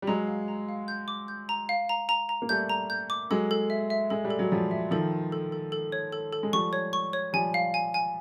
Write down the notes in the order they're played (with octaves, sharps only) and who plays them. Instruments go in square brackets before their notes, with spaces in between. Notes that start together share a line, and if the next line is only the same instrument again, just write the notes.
[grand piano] G3
[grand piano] F#3 G#3 [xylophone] A#5
[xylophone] F5
A#5
F5
G6
D6
G6
A#5
F5
A#5
A#5
A#5
[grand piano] A#3
[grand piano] G3 A3 [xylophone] G6
[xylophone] A#5
G6
D6
[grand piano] F#3 G#3 [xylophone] A4
[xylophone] A4
E5
E5
[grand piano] G#3 [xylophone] A4
[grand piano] G3
[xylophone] A4
[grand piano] F#3
[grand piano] F3 G3 [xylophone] C#5
[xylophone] E5
[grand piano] D#3 F3 [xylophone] A4
[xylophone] A4
A4
A4
A4
C#5
A4
A4
[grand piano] G#3
[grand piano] F3 G3 [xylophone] C#6
[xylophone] C#5
C#6
C#5
[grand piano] F3 G3 [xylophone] G#5
[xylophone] F5
G#5
G#5